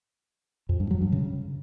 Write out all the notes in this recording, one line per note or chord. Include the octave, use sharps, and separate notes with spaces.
F2
G2
F#3
G2
C#3